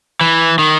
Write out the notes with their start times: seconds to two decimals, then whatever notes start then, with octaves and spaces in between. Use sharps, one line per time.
0.21 E3
0.59 D#3